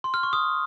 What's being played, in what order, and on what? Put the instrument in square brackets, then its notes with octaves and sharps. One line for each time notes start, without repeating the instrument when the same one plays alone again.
[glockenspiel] C6
F6
C#6
D#6